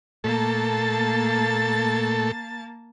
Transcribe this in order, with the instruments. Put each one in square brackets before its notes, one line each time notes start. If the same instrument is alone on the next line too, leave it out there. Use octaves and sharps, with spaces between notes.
[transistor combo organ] A#2 A3 A4 [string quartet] A#3 A5 A6